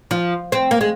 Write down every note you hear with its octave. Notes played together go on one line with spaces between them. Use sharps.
F3
C4
A#3
G#3